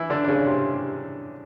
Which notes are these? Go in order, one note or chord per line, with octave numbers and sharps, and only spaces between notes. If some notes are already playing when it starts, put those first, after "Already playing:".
Already playing: E3 E4
D3 D4
D4
C#3 C#4
C3 C4